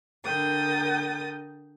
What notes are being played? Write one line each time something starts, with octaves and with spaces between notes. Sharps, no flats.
D3 A#4 G5 D#6 A6